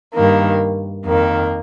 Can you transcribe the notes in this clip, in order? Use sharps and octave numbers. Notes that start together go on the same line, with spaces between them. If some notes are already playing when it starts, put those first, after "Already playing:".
D#3 A#3
G2
F2 D#3 A#3